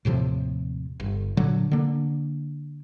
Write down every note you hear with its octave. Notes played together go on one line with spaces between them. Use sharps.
D#2 A2 C3 F3
G1
A#2 D3 F#3
D3 A#3